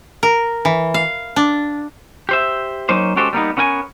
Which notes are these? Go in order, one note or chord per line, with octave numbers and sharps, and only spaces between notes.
A#4
E3
F5
D4
G4 C5 E5
F#3 A#3 C#4 D#4 C5
G#3 C#4 F#4 G4 A4 C5
G3 A#3 B3 D#4
B3 C#4 A#4 F#5 G#5